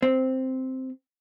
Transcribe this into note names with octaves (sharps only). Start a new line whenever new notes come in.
C4